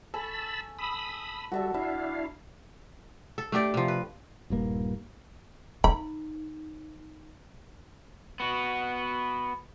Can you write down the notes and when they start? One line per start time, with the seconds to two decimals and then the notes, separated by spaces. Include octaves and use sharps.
0.14 A4 G#5 A5 B5 C#6 E6
0.79 B5 D#6 E6
1.52 G3 F#4 A4 E5 A5
1.74 D4 E4 E5 F5
3.38 A4
3.52 A3 D4 G4 D5
3.74 C3 F3
3.88 B4
4.50 D#1 G2 A#3
5.84 D#4 B5
8.40 B3 F#4